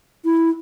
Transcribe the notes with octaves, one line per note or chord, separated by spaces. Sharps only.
E4